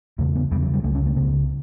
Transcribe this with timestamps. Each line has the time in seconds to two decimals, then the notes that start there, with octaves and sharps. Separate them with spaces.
0.18 E2 C#3 A3
0.35 B3
0.51 E2 G3
0.56 C#3
0.62 F#3
0.73 G3
0.84 C#2 C#3 A3
0.95 C#4
1.06 A3
1.16 C#2 C#3 B3